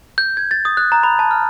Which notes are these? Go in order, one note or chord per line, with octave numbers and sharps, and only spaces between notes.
G6
G#6
A6
D#6
F#6
A#5
B5
A5
F6